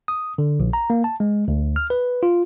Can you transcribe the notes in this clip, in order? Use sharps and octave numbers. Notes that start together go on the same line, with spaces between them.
D#6
D3
A#1
A#5
A#3
A5
G#3
D2
F6
B4
F4